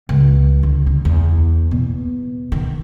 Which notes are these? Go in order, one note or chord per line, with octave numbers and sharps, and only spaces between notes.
C#2
D3
D3
E2
B2
D#3